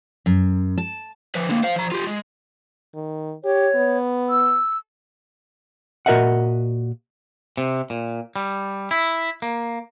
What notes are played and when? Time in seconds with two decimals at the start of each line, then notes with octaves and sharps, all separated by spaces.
0.26 F#2
0.78 A5
1.35 F3 B4
1.49 D3 A#3
1.63 C5 F5
1.76 F3 A#5
1.92 F4 G4
2.07 G#3
2.94 D#3
3.44 G4 C#5
3.75 B3
4.30 E6
6.06 A#2 F#4 A#4 D#5 E5 F#5
7.57 C3
7.90 A#2
8.36 G3
8.91 E4
9.42 A#3